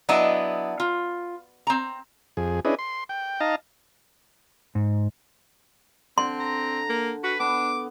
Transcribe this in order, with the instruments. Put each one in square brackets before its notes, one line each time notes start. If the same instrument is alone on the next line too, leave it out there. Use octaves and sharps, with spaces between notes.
[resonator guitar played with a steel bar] F#3 B3 D4 E4 D#5
F4
C4 A#5
[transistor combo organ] F2 G#4
C#4 D4 E4 G#4 B4 D#5
C6
G5
D#4 D#5 F5 A5 A#5
[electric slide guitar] G#2
[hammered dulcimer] D3 [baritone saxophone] C4 [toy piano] C6
[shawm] A#5
[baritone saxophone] A#3
[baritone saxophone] F#4 [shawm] B4
[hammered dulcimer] B3 [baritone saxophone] D4 [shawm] D6